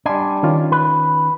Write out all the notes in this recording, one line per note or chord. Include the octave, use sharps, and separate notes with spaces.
G3 D4 D5 G#5 C6
D#3 C#4 F4
B4